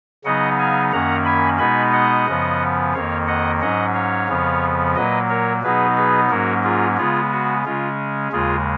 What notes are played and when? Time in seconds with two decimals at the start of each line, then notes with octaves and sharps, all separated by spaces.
0.24 C#3 F#3 B3 D#4 D#5 F#5
0.59 F5 G#5
0.92 F#2 D#3 A#3 C#4 F#5 A#5
1.25 G#5 B5
1.59 B2 G#3 B3 D#4 G#5 B5
1.93 D#5 F#5
2.26 F#2 C#3 F3 B3
2.94 F2 D#3 A#3 C#5 F5
3.28 D#5 F#5
3.61 G#2 F#3 C#4 D#5 F#5
3.94 C#5 F5
4.28 F2 C#3 F3 B3
4.95 A#2 F#3 A#3 B4 D#5
5.29 A#4 C#5
5.63 B2 F#3 B3 D#4 G#4 B4
5.96 G#4 B4
6.30 G#2 F#3 A#3 C#4 F#4 A#4
6.63 F4 G#4
6.97 C#3 G#3 B3 F4 G#4
7.31 F#4
7.65 C#3 G#3 C#4 F4
8.32 D#2 C#3 G#3 F4 G#4